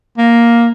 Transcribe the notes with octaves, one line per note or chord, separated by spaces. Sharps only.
A#3